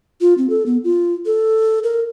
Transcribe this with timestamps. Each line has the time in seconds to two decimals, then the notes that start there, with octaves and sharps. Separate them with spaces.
0.21 F4
0.38 C4
0.50 A4
0.66 B3
0.84 F4
1.26 A4
1.84 A#4